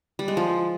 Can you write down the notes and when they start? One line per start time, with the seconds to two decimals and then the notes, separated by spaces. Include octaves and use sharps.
0.19 G3
0.28 G#3
0.37 F3